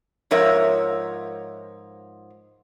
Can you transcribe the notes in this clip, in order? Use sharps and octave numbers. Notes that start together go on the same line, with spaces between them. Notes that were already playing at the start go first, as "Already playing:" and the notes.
G#2 F3 A#4 C#5 E5